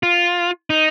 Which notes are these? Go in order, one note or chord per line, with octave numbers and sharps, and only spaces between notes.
F4
D#4